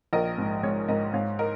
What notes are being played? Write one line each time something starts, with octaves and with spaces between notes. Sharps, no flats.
A#1 A#4 D#5
G#2
G#3 C#5
G#2 A#4 D#5
G#2 C#5 F5
A#4 D#5